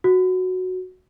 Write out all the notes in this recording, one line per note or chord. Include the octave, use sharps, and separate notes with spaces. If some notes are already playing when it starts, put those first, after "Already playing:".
F#4